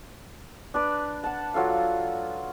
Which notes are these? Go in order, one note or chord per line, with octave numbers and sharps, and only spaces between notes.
D4 B4 D5
F#5 A5
F#3 F4 A4 F5